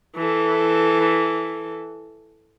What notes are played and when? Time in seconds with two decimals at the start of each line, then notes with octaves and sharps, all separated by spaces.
0.16 E3 A4